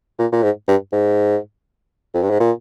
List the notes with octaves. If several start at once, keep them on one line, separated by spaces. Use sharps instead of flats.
A#2
A#2
G#2
G2
G#2
F2
G2
G#2
A#2